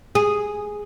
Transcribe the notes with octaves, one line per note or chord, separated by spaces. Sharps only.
G#4